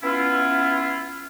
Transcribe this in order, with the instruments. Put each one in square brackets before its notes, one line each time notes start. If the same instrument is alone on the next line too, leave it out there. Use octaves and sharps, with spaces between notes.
[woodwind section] B3 C#4 E4 F4